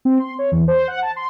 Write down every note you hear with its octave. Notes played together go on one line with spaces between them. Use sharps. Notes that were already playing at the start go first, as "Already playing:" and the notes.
C4
C6
C#5
E2
C5
F#5
A5
C6